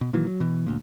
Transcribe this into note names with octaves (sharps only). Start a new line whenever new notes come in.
B2
A#2 D#3 E3 F#3
F#3
B2 E3
G1 D2 A#2